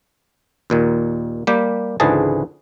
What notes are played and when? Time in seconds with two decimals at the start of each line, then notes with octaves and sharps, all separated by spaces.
0.70 D#2 A#2 D#3
1.47 G3 A#3 G4
2.00 C#2 G#2 D3 E3 G#4 A5